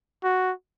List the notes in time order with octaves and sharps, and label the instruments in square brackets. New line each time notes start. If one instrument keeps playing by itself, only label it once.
[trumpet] F#4